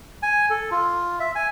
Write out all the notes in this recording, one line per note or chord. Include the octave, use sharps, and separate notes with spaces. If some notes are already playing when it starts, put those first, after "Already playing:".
G#5
A4
F4
E5
G#5